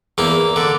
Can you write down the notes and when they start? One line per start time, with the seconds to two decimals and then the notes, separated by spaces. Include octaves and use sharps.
0.18 E2 A#3
0.56 D3